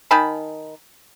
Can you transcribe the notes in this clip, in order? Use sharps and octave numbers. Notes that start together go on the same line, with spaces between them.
D#3 G#5 A5 B5